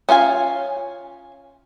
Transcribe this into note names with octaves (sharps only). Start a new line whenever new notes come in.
C#4 F4 F5 G#5